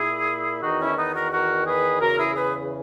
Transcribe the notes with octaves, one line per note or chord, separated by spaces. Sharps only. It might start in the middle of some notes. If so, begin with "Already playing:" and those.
Already playing: A#2 E4 G#4
E2 D#3 D#4 F#4
C#4 E4
B3 D#4
F#4 A#4
F#4 A#4
G#4 B4
E2 C#3 E3 F#4 A#4
E4 G#4
G#4 B4